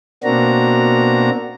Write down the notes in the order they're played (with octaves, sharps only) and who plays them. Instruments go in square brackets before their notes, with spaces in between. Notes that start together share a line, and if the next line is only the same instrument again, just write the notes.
[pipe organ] B2 A#3 C4 D4 F#4 A#5